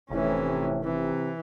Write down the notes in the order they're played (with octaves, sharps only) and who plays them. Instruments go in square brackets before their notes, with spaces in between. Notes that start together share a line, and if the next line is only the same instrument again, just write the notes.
[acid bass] F1 [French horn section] A2 C3 [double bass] E3 C#4
[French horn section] C3 [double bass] E3